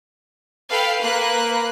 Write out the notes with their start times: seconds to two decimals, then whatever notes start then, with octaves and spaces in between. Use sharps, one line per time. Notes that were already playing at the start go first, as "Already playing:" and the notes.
0.70 A4 B4 F5 G5
0.99 A#3 B4 F#6